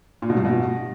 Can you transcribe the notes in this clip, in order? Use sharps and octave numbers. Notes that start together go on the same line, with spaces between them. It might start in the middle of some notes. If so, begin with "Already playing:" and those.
A#2
B2
G2
B2